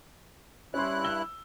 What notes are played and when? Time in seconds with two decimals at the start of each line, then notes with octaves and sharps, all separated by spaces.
0.74 G2 C#4 E4 C6 F#6
1.04 E6 G7